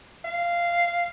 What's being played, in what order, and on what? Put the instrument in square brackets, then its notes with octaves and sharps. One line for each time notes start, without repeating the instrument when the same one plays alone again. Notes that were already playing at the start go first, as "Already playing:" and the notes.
[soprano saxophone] F5